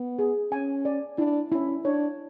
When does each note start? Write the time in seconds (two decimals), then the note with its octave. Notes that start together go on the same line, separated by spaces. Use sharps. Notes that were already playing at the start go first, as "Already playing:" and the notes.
Already playing: B3
0.19 G#4
0.52 C#4 G#5
0.85 D5
1.18 D4 E4
1.52 C#4 E4
1.85 D4 C#5